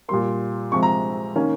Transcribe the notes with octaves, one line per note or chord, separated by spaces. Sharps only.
A#2 G3 A#3 C6
C3 F3 G#3 C#6
A#5
D#3 A#3 C#4